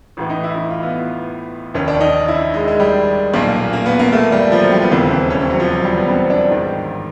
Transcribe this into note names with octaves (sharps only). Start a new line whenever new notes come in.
A1 A2 E3
D#4
E4
E4
F4
B3
F1 D#2 D#3 C#4
D4
D#4
E4
G#3
G#3
G3
B1 A#2 A#3
A#3
B3
A#3
A3
G3
F3
F#3
G3
B3
E1 D#2 C#3 E3 C4
C4
C#4
C4
F#3
F3
F#3
G3
B3
C4
D4
A1 G#2 D#3